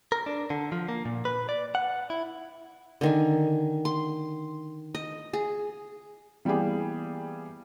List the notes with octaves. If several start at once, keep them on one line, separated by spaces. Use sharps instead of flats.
A#4
D4
D3
F3
A#3
A#2
B4
D5
F#5
E4
D3 D#3 G#5
C6
D#5
G#4
E3 G3 A#3 B3 G4 G#4